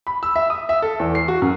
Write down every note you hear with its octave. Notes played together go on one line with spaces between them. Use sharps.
B5
E6
E5
D#6
E5
A4
E2
C7
F#4
F#2